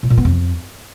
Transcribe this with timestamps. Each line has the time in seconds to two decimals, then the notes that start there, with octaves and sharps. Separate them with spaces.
0.03 A2
0.10 A#2
0.18 B3
0.25 F2